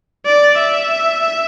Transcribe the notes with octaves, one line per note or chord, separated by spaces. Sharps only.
D5
E5